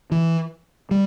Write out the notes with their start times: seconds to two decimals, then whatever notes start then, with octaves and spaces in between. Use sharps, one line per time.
0.12 E3
0.91 G3